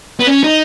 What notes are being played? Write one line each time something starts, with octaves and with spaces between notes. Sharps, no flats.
B3
C#4
D#4